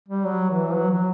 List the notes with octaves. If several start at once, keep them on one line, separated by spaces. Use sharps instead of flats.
G3
F#3
E3
F#3
F#3